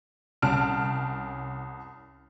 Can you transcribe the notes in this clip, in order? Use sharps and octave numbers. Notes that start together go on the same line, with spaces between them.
C2 C#4 A5 F6 D7 E7